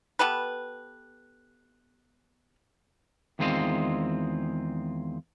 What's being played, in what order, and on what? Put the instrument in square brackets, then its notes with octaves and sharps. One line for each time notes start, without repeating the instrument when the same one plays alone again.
[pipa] B3 G4 A4 B4
[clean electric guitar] E2 D#3 G#3 C4 F4 D#5